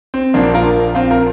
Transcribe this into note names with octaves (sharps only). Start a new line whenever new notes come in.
C4
A#1 A#2 F3 A#3 D4
F4 A#4
C4 F4
F4 A#4